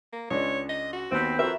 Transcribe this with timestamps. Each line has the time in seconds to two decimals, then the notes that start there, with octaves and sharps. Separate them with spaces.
0.13 A#3
0.30 C#2 G#3 D4 C#5
0.69 D#5
0.93 F#4
1.12 D#2 B3 C4
1.39 F2 C4 F#4 A#4 B4 E5